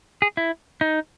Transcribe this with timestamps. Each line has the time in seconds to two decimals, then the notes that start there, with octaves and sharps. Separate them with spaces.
0.22 G#4
0.37 E4
0.81 D#4